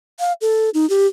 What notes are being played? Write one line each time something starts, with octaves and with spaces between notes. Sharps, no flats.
F5
A4
D#4
G4